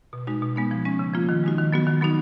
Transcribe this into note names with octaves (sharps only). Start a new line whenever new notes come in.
B2
G#3 D#4 F#4
B2
G#3 B3 D#4
F3
G#3 C#4
C#3
F3 A#3 F4
D#3
G#3 D#4 F#4
D#3
F#3 B3 F#4
D#3
F#3 B3 D#4 F#4